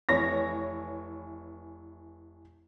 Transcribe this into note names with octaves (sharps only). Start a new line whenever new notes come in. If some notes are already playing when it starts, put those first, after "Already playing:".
F1 E3 E4 C#5 A#6